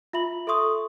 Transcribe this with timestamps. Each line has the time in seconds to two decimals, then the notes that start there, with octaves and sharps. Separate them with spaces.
0.13 F4 E5 B5 F#7
0.47 A4 E5 C6 C#6 D#6